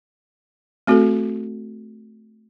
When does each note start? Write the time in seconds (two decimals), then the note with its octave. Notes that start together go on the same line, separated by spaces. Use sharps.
0.87 A3 C4 F#4 A4